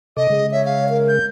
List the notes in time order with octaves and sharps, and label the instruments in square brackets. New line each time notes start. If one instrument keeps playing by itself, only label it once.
[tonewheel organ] C3 A4 D6 [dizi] D#5
[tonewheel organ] C#3 G#3 [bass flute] G#4
[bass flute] C#5 [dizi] E5
[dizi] F5
[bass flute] A#4
[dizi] G6